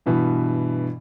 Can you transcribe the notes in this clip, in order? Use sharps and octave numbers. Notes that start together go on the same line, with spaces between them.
G2 B2 E3